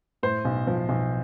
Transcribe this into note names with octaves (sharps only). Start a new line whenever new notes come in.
A2 C5
B1
F3
B1